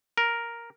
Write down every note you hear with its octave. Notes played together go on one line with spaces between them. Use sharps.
A#4